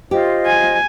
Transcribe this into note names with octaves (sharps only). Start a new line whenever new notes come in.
F4 G4 C5 D#5
G#5